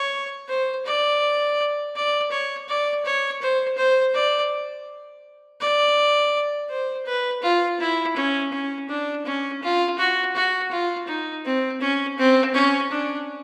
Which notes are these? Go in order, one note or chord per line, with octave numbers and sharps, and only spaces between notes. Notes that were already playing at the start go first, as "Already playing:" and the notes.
Already playing: C#5
C5
D5
D5
C#5
D5
C#5
C5
C5
D5
D5
C5
B4
F4
E4
C#4
C#4
D4
C#4
F4
F#4
F#4
F4
D#4
C4
C#4
C4
C#4
D4